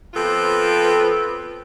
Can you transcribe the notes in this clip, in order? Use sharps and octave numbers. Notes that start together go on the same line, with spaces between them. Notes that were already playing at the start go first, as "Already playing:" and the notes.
F3 B3 C4 F4 A4 B4